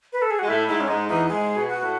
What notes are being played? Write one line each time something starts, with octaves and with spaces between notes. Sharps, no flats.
B4
A4
G#4
G#3 F#4
A2 A3 E4
G#2 G#3 E4
C#4
G#2 G#3 D#4
E2 E3 D#4
G#2 G#3 G#4
B2 B3
F#4
A2 A3